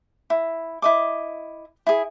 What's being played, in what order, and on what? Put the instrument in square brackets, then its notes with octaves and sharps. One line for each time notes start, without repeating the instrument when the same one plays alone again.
[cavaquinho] E4
E4 D#5 D6
E4 G#4